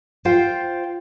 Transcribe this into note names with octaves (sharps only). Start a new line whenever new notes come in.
F4 C5 F5 G5